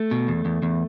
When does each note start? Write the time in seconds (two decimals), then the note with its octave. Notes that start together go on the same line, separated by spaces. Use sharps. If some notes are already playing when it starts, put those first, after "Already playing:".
Already playing: A3
0.11 B2
0.28 E2
0.45 E2
0.62 E2